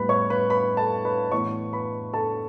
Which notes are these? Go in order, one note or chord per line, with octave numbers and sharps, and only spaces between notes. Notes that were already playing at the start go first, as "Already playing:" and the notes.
Already playing: A2 G3 B3 B4 B5
C#5 C#6
B4 B5
B4 B5
A4 A5
B4 B5
A2 E3 B3 C#5 C#6
B4 B5
A4 A5